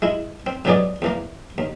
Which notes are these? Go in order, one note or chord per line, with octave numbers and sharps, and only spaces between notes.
G#3 E4
C4
G#2 C#3 F#3 B3 G#4 D5
E2 E3 A#3
D#2